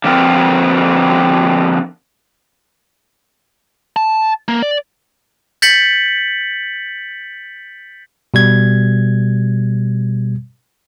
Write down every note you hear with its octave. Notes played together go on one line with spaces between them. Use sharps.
D3 F3 B3 C4 A#4
A5
A#3
D5
G6 A6 B6 C#7 F#7
B2 G3 G#6